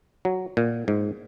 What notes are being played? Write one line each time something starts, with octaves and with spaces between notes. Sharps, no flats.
F#3
A#2
G#2